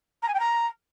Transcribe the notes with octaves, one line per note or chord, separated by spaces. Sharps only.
A#5
G#5
G5
A#5